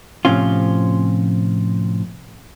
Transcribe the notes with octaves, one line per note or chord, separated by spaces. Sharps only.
A2 C3 F3 C4 C#4 F4